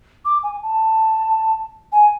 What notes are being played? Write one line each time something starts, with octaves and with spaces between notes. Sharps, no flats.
D6
G#5
A5
G#5